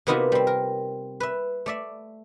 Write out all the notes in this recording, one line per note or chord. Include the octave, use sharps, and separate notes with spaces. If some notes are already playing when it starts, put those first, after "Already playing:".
C3 A#3 B3 D#4 F4 F#4
G3 C4
A#4
B4 E5
A3 D5 E5